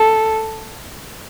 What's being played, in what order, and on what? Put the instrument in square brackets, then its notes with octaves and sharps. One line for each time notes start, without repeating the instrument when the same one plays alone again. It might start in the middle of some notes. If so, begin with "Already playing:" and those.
Already playing: [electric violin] A4